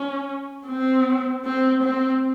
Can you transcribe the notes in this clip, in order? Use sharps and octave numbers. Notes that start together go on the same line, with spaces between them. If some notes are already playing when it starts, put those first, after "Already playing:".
Already playing: C#4
C4
C4
C4